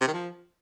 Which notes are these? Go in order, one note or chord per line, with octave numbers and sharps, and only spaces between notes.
C3
D#3
F3